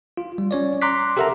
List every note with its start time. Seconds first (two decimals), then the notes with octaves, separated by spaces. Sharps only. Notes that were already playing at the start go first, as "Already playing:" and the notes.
0.17 F4
0.38 G3
0.51 C#4 C#5 D5
0.82 A#5 C6 D6 F#6 B6
1.17 G4 A4 A#4 E5 F#5 A#5